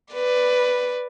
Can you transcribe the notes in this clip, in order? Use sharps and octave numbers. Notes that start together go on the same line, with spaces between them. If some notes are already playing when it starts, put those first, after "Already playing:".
B4 D5